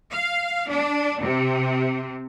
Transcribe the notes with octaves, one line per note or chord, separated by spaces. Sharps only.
F5
D4
C3